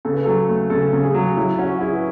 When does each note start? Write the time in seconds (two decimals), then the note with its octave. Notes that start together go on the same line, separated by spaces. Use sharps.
0.05 C#3 A4
0.14 B4
0.25 F#3 A4
0.49 A3
0.70 C#3 A4
0.93 C#3
1.04 G#4
1.14 F#3
1.37 F#3 E4
1.58 C#4 F#4
1.75 F#4
1.80 E4 G#4
1.93 B4